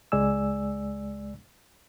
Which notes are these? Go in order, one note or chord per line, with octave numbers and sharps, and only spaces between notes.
C#2 G#3 D5 G#5 E6